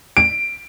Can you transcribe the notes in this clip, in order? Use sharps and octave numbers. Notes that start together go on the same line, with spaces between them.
D7